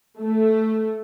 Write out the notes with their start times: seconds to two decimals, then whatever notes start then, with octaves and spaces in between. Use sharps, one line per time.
0.20 A3